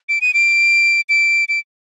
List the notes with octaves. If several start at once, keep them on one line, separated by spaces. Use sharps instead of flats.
D7
D#7
D7
D7
D7